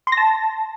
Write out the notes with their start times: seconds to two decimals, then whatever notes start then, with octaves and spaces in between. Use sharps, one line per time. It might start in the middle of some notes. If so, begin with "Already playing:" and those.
0.07 C6
0.12 A#6
0.17 A5